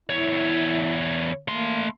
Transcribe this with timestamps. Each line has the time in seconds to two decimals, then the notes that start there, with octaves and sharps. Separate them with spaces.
0.10 E2 E4 C#5
1.48 A3 A#3 C6